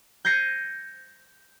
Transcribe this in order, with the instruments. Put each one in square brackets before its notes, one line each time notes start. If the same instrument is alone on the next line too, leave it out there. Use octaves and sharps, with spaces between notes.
[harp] G6 G#6 A#6 C7 C#7 D#7